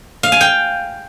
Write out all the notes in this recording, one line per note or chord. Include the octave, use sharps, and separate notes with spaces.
F5
G#5
G5